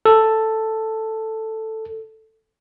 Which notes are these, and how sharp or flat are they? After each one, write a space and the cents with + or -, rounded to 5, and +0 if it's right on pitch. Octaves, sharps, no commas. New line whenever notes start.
A4 +5